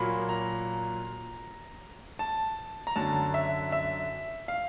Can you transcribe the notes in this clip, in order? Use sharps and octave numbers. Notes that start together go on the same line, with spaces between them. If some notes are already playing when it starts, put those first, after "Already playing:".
Already playing: A#2 F#3 A#3 B5
A#5
A5
A#5
F#2 D3 F#3 A5
E5
E5
F5